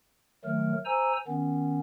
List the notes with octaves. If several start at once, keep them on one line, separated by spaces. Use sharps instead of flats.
D#3 F#3 A3 A#4
C5 G#5 A#5 E6
D#3 B3 C#4